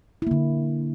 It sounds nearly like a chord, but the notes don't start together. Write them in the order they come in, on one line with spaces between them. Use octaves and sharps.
E4 A#3 D3